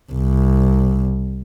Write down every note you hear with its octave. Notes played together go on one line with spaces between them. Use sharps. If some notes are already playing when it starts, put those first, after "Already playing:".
C2